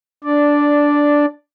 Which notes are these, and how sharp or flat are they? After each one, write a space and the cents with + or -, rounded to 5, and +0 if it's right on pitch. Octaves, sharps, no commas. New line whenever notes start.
D4 -10 D5 +0